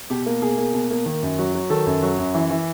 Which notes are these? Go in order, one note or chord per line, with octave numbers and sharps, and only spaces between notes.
B2 G4
A#3
B2 G#4
A#3
B2
A#3
D#3
F#2
F#3
F#3
D#3 A4
F#2
F#3
F#2
E3
E3